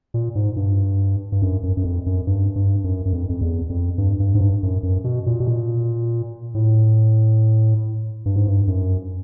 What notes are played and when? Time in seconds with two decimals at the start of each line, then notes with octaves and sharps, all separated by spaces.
0.14 A#2
0.35 G#2
0.56 G2
1.32 G2
1.42 F#2
1.63 F#2
1.77 F#2
1.84 F2
2.06 F#2
2.27 G2
2.56 G2
2.84 F#2
3.05 F#2
3.13 F2
3.29 F2
3.41 E2
3.70 F2
3.98 G2
4.20 G2
4.35 G#2
4.41 G2
4.63 F#2
4.83 F#2
5.04 B2
5.26 A#2
5.40 B2
5.47 A#2
6.55 A2
8.26 G2
8.36 G#2
8.47 G2
8.67 F#2